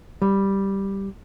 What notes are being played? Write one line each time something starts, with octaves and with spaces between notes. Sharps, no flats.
G3